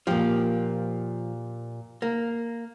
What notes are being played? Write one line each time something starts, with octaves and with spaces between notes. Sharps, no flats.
A#2 F3 G4
A#3